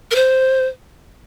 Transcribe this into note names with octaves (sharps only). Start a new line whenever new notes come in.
A#4
C5